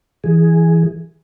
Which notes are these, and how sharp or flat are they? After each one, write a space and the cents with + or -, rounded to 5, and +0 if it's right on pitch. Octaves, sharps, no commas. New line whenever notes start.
E3 +0 G#4 +0